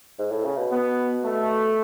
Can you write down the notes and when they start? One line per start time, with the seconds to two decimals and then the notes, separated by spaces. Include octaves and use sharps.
0.19 G#2
0.31 A2
0.45 C#3
0.57 B2
0.70 B3
1.22 A3